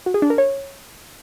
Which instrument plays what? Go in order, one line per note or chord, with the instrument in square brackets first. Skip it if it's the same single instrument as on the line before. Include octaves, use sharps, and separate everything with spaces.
[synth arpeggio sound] F#4
G#4
D4
A#4
C#5